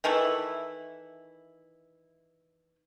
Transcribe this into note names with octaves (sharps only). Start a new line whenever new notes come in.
D#3 E3 A3 E4